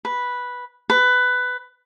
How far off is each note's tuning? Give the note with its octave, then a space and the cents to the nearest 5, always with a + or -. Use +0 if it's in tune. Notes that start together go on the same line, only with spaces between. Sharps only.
B4 -5
B4 +15